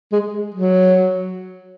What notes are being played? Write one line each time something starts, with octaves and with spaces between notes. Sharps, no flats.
G#3
F#3